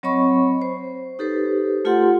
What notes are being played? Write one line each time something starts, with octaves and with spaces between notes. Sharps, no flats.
F#3 C4 C#5 D#5 B5 C#6
C5
D#4 G4 A4 B4 C5
A3 F4 G4 A4 F#5 C6